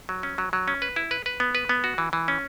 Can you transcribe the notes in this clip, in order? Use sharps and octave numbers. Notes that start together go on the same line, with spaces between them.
F#3
C#4
F#3
F#3
C#4
B4
E4
B4
B4
B3
B4
B3
F#4
E3
E3
C#4